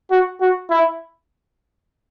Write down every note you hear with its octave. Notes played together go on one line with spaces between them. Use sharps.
F#4
F#4
E4